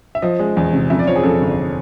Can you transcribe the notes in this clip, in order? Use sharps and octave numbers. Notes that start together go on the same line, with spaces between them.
E5
F3 D#5
G#3
E2
C3
F2 E5
D5
F3 C#5
G#4
F2 A4
G1